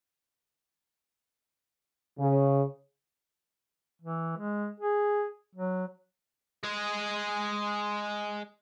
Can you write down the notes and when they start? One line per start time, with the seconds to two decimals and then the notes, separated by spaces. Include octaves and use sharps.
2.19 C#3
4.02 E3
4.37 G#3
4.80 G#4
5.55 F#3
6.64 G#3 G#4